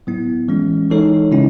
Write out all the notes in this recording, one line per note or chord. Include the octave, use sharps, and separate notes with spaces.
A2 F#3 B3 E4
E3 G#3 C#4
E3 G#3 D#4 A4 C#5
C#3 G#3 C#4 E4